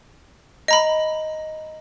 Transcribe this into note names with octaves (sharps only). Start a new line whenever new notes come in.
D#5 A#5 B5